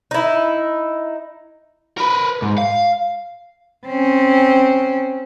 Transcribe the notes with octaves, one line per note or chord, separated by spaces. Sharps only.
D#4 E4
A#4 B4
G#2
F5
C4 C#4